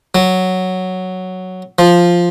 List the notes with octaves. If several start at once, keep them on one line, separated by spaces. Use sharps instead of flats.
F#3
F3